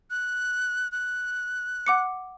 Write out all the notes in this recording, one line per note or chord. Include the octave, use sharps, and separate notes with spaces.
F#6
F#6
F#5 D6 C#7